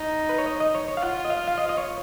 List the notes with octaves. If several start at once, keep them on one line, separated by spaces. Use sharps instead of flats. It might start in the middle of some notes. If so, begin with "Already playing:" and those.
Already playing: D#4
B4
C#5
D#5
D#5
C#5
C#5
F5
F4 F#5
D#5
F5
F5
D#5
D#5
C#5